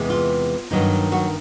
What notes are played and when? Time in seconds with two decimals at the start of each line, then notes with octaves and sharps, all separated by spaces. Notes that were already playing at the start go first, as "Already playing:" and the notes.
Already playing: E2 C3 E3 G#3
0.10 F4
0.71 G2 D#3 F#3 A#3 D#4
1.12 F#3 F#4